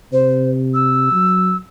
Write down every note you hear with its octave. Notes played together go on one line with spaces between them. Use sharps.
C3 C5
E6
F#3